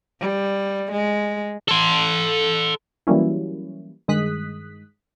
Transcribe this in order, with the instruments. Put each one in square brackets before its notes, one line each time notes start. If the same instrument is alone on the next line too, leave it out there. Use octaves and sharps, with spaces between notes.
[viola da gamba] G3
G#3
[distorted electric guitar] A4 C6
[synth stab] E3 F#3 G3 A#3 C#4 E4
G2 D#3 G#3 D#6 F#6 B6